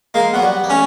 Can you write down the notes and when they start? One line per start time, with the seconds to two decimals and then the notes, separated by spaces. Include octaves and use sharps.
0.14 G#3 A#3
0.33 F#3 B3
0.42 G3
0.51 B3
0.64 A#3
0.70 A3 C#4